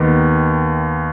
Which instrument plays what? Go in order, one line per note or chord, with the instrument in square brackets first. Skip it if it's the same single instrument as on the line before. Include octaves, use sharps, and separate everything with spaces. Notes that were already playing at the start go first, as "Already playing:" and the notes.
Already playing: [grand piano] D#2 D#3 B3